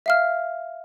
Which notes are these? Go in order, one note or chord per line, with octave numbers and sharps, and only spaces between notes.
E5 F5 F6